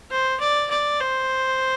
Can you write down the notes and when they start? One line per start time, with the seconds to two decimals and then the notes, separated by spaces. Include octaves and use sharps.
0.11 C5
0.40 D5
0.70 D5
1.00 C5